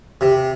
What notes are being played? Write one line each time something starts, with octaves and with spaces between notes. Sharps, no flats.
C3